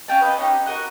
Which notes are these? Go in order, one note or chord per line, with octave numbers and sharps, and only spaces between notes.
C#4 F5 G5 A5
B4 D#5 E5 A5
C#4 D#4 E4 G4
F#4 A#4 D#5 F#5